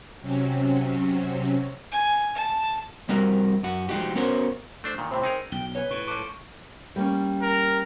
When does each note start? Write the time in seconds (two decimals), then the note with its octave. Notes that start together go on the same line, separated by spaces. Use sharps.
0.21 C3 F#3 C4 C#4
1.91 G#5
2.35 A5
3.09 F2 G3 C4 F#4 A#4
3.63 F#2 F#4
3.89 F3 G#3 C4 D#4 F#4 G4
4.15 B3 C#4 F#4 A#4 C5 C#5
4.84 A3 D4 C5
4.98 A#2 D#3
5.11 A2 C3 C4
5.24 D#4 G#4 A#4
5.52 B1 G5 G7
5.75 B4 C#5 G#5
5.91 A2 C#6
6.08 F3 A4 C#6 D6 D7
6.96 G3 A#3 C#4
7.42 A#4